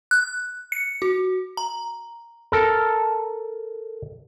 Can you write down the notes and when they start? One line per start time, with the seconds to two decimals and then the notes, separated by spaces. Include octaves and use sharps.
0.11 F#6
0.72 C#7
1.02 F#4
1.57 A#5
2.52 A4 A#4